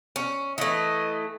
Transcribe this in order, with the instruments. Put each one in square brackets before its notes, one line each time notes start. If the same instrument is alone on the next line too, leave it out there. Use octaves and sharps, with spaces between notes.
[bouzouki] C#4
[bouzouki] E3 A3 [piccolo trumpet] D#5